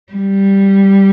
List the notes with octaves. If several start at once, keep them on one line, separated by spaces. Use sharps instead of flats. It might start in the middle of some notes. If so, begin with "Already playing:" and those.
G3